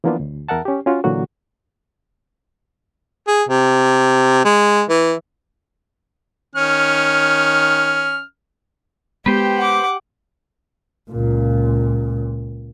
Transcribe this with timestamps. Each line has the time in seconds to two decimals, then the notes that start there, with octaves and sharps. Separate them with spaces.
0.04 E3 F3 A#3 B3 D4 F4
0.20 D2
0.49 E2 A#4 E5 F#5 A5
0.65 C#4 G4
0.86 C#4 F4 F#4
1.04 A#2 D3 E3 F#3 A#3 F#4
3.27 G#4
3.49 C3
4.45 G#3
4.89 E3
6.56 D#3 C#4 F6
9.26 G#3 B3 G4 B4 C5 G5
9.58 F#5 D6
11.10 C#2 A#2